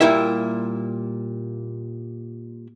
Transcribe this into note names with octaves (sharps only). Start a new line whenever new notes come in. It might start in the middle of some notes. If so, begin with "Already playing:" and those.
A#2 G3 A#3 E4 E5